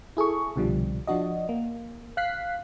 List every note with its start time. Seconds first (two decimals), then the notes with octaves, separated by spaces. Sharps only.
0.17 E4 G#4 A4 C#6
0.56 C2 B2 D3 F3 G3
1.07 F3 D4 F#4 D#5
1.49 A#3
2.17 F5 F#6 B6 C7